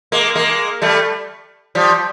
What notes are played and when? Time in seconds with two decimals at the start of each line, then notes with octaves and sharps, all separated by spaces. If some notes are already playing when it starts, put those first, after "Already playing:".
0.12 G#3 A#3
0.35 G#3 A#3
0.82 G3 A3
1.75 F3 G3